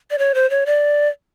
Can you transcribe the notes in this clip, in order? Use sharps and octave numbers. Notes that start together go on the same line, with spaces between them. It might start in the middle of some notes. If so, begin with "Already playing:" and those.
D5
C#5
C5
C#5
D5